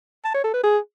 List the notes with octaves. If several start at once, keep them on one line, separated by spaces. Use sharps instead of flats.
A5
C#5
A4
B4
G#4